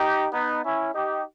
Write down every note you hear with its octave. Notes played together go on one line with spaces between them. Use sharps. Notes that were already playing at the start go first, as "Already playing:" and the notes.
Already playing: D#4 G4
B3 D#4
C#4 E4
D#4 G4